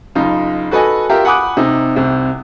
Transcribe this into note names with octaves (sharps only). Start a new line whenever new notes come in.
F#1 D#4 F4
F#4 A4 B4 D#5 G#5
F4 G4 A#4 E5
F#5 G#5 B5 D6 D#6 F#6
C3 D#4
C2 C3